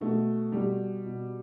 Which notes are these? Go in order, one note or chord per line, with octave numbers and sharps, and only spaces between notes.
B2 A3
B2 G3
B2